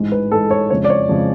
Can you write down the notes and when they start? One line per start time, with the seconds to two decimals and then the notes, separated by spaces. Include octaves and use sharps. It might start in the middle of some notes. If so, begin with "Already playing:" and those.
Already playing: A1 G#2 G#3
0.12 B4
0.31 A1 G#2 G#3 A4
0.51 C#5
0.70 F2 C#3 G#3 C#5
0.84 D5
0.90 C#5
1.09 F2 C#3 G#3